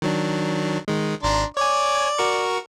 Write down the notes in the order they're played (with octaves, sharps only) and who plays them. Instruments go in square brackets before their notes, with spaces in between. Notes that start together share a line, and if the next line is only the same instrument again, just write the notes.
[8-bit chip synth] D#3 F#3 D4
D#3 G#3
[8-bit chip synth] G#1 [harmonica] D4 A#5 C6
[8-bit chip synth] C#5 G#5 [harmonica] D5 D6
[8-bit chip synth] F#4 A#4 C#6